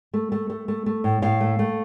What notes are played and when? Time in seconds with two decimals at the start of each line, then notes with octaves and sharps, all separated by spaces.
0.14 A3
0.32 A3
0.50 A3
0.68 A3
0.86 A3
1.04 A2
1.22 A2 F5
1.40 A3
1.59 A3